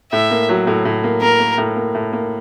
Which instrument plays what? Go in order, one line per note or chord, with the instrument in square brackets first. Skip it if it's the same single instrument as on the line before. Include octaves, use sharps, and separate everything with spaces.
[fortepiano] A2 [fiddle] E5
[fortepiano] A#3
F#3
A2
A2
A#3
[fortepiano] A#3 [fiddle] A#4
[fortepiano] A#3
A2
A#3
A2
A#3